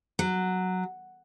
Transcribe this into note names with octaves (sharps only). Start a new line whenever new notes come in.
F#3